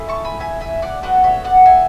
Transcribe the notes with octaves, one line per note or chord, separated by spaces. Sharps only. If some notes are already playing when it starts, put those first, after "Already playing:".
Already playing: A3 E4 G#4
A5 C#6
G#5 B5
E5 G#5
E5 G#5
D5 F#5
B3 F#4 A4 D5 F#5
C#5 E5
D5 F#5
E5 G#5